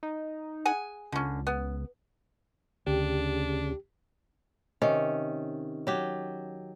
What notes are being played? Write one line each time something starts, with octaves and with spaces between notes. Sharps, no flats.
D#4
G#4 F#5 G#5
C#2 D3 C#4
B3
D2 C#3 D4 G4
C3 D#3 C#4
F#3 G4